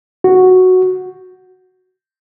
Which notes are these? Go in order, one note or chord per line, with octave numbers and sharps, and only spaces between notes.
F#4